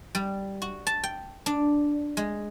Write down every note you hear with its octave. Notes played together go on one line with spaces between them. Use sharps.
G3
F#4
A5
G5
D4
G#3